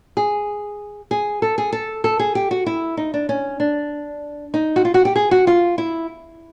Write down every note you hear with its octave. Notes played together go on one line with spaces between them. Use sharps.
G#4
G#4
A4
G#4
A4
A4
G#4
G4
F#4
E4
D#4
D4
C#4
D4
D#4
F#4
F4
F#4
G4
G#4
F#4
F4
E4